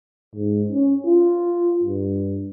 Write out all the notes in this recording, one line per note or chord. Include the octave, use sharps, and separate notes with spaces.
G#2
C#4
F4
G2